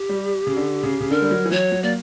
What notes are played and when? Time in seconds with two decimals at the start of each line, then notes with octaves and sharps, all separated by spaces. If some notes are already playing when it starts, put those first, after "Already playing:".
Already playing: G4
0.09 G3
0.47 C#3
0.57 D3
0.83 C#3
1.00 C#3
1.11 D3 A#4
1.22 G3
1.31 F#3
1.45 E3
1.51 F#3 C#5
1.72 F#3
1.83 A#3 D5